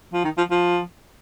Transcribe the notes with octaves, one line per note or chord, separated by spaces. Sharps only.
F3
D#3
F3
F3